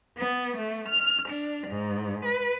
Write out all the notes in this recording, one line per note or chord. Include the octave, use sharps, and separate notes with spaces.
B3
A3
F6
D4
G#2
B4